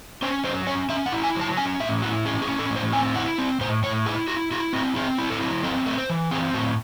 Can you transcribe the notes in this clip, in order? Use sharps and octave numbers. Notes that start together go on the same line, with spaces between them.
C#4 C5
F#3 C5
C#4 C#5
C#4 E5
F#5
E4
G#5
F#3
A5
C#4 G#5
A2 E5
E4 F#4
C#4 G#4
G#4
C#4
A4
A2
C5
C4 G#5
E4 F#5
C4
A2 C5
A2 C#5
E4 G#4
E4 F#4
E4 F#4
C4 F#4
C4 G#4
E4
A4
F#3
C4 A4
A3
C5
E3
C4 G#4
A2 F#4